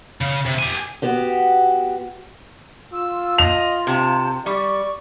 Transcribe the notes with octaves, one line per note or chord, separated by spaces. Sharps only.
C#3
C3
G4 G#5
B3 F#4 G4
F4 E6
D#5 F7
C3 A5
G3 D5 C#6